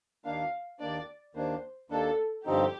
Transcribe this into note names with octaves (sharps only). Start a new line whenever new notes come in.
D#2 D#3 A#3 D4 F5
D#2 D#3 A#3 D4 D5
D#2 D#3 A#3 D4 C5
D#2 D#3 A#3 D4 A4
G2 D3 F3 C4 D#4 G4